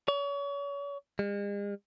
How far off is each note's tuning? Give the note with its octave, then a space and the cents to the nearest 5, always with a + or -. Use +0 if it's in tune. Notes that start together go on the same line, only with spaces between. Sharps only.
C#5 +35
G#3 -45